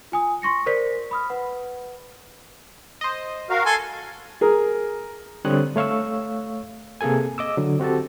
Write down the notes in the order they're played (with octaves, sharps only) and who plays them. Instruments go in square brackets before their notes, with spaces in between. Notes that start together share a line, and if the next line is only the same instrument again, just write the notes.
[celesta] F4 G#5 D#6
C6 C#6 A#6 C#7
A#4 C5 D5 B6
B5 D#6 F6
B4 F#5
[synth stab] C5 D#5
[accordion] F#4 A#4 F5
[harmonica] A4 G#5 [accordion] C6
[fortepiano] G#4 A#4
[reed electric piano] D3 G3 C4 C#5 D#6 F#6
A3 C#5 F5 C#6 E6
C3 A#3 G#4 A4 G#5
D#5 D6 E6
D3 F#3
C4 F#4 G4 A4 A5